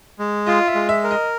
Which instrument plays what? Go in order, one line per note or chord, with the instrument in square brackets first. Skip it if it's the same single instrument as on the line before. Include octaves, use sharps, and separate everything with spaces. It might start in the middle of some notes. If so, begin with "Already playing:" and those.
[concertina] G#3
[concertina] F4 [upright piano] D#5
[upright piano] E5
[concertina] G#3
[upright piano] E5
[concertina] A#4
[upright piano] D#5